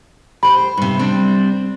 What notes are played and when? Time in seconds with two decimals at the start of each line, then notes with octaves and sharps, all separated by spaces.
0.43 G4 C5 B5
0.77 G2 C3
0.99 G3 C4 D4